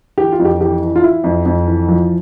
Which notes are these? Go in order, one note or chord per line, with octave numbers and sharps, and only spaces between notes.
E3 G4
F4
F2
G4
E3 G4
E3
F4
E3 E4
F2
F2
E3
F3